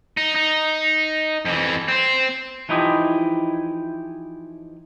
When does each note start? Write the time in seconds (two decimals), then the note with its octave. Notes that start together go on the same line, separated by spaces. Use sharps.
0.17 D#4
0.36 D#4
1.45 F2 E3
1.88 C4 C5
2.69 E3 F3 D#4 E4 G4 D#5